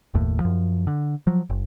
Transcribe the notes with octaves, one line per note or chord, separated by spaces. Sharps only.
F#1 D#2 A2
F#2 F3
D3
F3 F#3
F#1